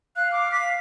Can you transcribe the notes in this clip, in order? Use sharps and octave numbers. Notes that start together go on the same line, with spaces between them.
F5 F#6
D6
B6